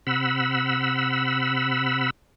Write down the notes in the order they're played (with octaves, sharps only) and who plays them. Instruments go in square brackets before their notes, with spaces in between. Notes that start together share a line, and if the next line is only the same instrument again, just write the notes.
[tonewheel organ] C3 F#5 B5 E6